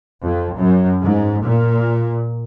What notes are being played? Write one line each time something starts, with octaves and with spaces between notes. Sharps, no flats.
F2
F#2
G#2
A#2